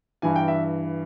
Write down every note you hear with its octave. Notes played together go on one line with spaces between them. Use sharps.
G2 E3 G#5
G5
E5